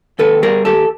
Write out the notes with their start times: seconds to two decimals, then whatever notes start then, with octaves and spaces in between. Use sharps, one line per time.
0.19 D#2 A4 B4
0.43 G3 G#4 A#4
0.65 D#2 G4 A4